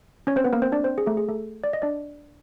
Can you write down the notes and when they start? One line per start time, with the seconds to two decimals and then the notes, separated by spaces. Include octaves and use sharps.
0.27 C#4 C#5
0.36 C4 C5
0.44 B3 B4
0.53 A#3 A#4
0.62 C4 C5
0.72 D4 D5
0.84 C4 C5
0.98 G#4
1.06 A3 A4
1.17 G#4
1.29 A3 A4
1.64 D5
1.73 D#5
1.82 D4 D5